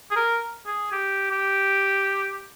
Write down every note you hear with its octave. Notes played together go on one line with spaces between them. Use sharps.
G#4
A#4
G#4
G4
G4